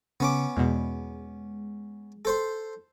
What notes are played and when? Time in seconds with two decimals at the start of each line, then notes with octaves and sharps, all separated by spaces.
0.20 C#3 B3 C#4 D6
0.57 E2 B2 G#3
2.25 A4 C5 C6